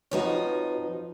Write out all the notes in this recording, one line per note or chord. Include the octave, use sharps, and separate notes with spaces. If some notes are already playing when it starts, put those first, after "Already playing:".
F2 F3 D#4 F#4 B4 C#5